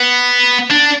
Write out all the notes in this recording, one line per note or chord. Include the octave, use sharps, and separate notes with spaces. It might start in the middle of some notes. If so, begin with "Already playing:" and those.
Already playing: B3
D4